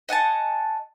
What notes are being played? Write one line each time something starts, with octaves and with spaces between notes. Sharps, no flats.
D#5 F#5 G#5 A5